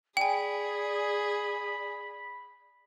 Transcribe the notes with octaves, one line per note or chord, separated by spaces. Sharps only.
G#4 D5 G5 G#5 B5